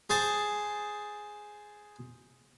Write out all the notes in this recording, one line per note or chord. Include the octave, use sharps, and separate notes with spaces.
G#4 C5 A5